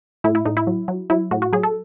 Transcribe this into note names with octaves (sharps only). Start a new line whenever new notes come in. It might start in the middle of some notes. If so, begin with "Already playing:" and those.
A2 E4
E4
A2 D#4
E4
F#3
F#3
F#3 E4
A2 F#4
F#4
F#3 G#4
A4